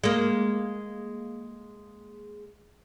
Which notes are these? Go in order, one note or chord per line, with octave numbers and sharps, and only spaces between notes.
G#3 A#3